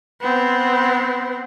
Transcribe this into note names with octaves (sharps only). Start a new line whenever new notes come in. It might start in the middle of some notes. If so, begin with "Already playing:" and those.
B3 C4